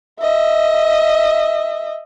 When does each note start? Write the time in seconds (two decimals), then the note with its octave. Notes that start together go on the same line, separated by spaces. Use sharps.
0.20 D#5 E5